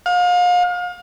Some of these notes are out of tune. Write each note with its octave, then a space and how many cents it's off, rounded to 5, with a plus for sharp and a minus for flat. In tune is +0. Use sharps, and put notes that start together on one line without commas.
F5 +35